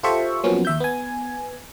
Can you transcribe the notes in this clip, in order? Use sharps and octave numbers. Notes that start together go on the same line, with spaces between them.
F4 G4 A4 C5 E5 C#6
F3 F#3 A#3 B3 C#4 F#4
D#2 E5 G6
B3 G#5